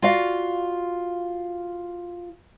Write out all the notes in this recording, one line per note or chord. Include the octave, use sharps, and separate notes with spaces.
F4 F#4 D5 F5